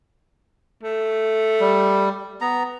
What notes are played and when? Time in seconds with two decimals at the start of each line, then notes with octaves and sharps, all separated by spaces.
0.84 A3
1.60 G3
2.41 B3 A#5